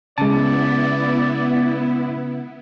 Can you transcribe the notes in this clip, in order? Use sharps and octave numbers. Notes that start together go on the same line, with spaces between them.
C#3 G#3 B3 E4 D5 A5